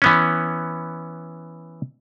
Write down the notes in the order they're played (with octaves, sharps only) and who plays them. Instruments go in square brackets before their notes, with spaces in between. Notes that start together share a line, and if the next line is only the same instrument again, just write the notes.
[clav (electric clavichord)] E3 B3 C#4